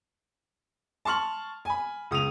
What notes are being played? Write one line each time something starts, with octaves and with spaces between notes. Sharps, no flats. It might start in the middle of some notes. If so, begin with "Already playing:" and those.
A5 C6 C#6 F6 F#7
G#5 B5
C#2 D#6 D#7 F7